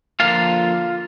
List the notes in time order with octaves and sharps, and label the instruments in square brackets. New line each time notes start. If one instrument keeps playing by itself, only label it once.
[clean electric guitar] D3 F3 A#3 D4 F4 F5